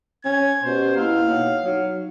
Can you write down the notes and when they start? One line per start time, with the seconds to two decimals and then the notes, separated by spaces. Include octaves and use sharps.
0.25 C#4 G#6
0.63 B2 C#4 G4 C5
0.96 A#3 E4 F5
1.27 D#4 C#5 F#5
1.65 F#3 D#4